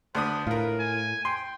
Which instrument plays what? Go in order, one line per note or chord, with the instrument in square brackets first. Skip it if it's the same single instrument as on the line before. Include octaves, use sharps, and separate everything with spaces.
[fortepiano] D2 D4 D#6 [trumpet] B4
[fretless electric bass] A2 [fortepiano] F4 A#4 [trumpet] B4
[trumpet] G#5
[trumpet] G5 [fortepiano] C6